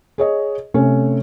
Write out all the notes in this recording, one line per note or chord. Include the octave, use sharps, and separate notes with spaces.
G#4 C#5 D#5
C3 A3 C#4